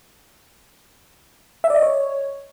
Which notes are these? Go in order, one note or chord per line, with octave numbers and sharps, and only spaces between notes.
E5
D5
D#5
C#5